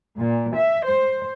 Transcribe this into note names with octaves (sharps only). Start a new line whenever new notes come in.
A#2
E5
C5